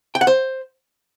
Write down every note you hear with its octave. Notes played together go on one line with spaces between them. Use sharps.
G5
F#5
C5